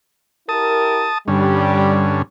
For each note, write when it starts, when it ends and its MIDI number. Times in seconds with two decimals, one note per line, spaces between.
0.49 1.09 64
0.49 1.09 67
0.49 1.09 70
0.49 1.18 81
0.49 1.18 87
1.28 2.22 43
1.28 2.22 50
1.28 2.09 55
1.28 2.22 61